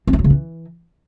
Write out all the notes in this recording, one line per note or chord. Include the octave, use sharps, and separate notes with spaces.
C4
F3
F#3
C#3
E3